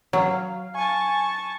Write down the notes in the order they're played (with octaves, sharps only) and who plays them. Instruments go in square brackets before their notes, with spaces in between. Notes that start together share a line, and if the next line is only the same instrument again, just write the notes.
[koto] F#3 [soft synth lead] F5
[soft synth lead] G#5 [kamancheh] A5 C#6